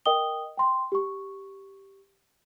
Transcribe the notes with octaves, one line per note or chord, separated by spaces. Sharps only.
A#4 D#5 G5 D#6 G7
G5 C6
G4 C#6